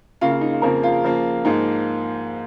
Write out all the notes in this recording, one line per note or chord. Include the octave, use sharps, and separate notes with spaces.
C#3 A#3 F4
F4
D#4
F4
F2 C#3 F3 A#3 A#4
F4
C#3 F3 A#3
G#2 F3 A#3 D#4